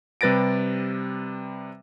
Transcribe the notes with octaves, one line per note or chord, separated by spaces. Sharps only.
C3 G3 B4 A6 A#6 D7